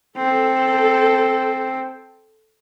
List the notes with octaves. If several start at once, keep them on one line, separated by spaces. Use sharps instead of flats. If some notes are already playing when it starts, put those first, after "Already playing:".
C4 A4